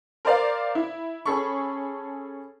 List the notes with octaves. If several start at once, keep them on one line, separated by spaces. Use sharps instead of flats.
A#4 C5 D5 F5
E4
C#4 G#4 A4 B5 C#6